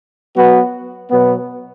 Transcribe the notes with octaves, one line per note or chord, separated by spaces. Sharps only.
F#3 B3 F#4 B4
B2 F#3 B3